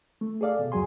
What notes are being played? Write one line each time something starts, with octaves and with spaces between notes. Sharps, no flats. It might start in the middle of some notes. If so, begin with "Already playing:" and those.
A3
G#4 A4 D5 F5
B2
C#2 F#2 F#3 G#4 G#5 C6